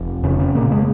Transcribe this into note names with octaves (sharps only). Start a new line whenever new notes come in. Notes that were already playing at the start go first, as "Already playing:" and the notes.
Already playing: F1
F2 C#3 C#4
C#3 C#4
A#2 C#3 A#3
G#3